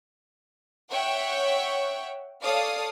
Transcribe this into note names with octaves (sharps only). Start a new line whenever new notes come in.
C#5 E5 F#5 G5 C#6
A4 C#5 D5 F5 D#6